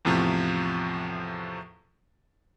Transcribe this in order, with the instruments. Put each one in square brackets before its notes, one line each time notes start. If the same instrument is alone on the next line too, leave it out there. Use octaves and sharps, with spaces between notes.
[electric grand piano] E2 A2 C3 F3